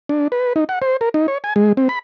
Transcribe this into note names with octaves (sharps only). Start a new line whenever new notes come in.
D4
B4
D#4
F#5
C5
A#4
D#4
C#5
G#5
G#3
C4
B5